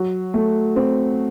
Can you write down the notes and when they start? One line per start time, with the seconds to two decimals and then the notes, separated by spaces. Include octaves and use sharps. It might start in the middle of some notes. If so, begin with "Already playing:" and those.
Already playing: F#3
0.34 A3
0.76 C4